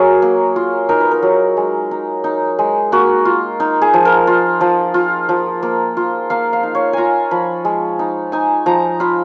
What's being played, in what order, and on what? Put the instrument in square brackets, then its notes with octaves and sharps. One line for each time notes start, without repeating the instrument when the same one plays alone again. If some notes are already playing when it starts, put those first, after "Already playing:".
Already playing: [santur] F#3 F#4 G#4 A#4
A#3
F4
D#4 A#4
B4
A#4
F#3
G#3
D#4
D#4
G#3
A#3 F#4
F4
D#4
G#4
F3
A#4
F4
F3
F4
F3
A#3
F4
A#3 F5
F5
D#4
C#5
F4 G#5 A#5
F3 B5
G#3
D#4
D#4 G#5
F3 A#5
F4 B5